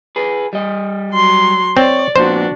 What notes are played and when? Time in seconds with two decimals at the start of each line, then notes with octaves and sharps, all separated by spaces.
0.16 G#4 B4
0.53 G3 D#5
1.12 F#3 C6
1.77 C4 C#5 D5
2.16 F2 A#2 B3 D4 F#4 C5